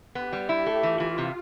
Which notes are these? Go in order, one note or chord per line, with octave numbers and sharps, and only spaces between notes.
B3 G4
G3
E4 G4
A3
E3 F4
E3
C3